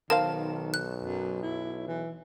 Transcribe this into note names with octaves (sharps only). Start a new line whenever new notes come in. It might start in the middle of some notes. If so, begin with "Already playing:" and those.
B1 D#3 A#4 C5 F5 A5
F#6
F#2
E4
E3